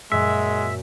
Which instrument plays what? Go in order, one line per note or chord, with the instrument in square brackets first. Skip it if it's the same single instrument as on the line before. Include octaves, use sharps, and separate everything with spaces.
[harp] F#2 A#2 F#3 [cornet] G#3 [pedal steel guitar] E5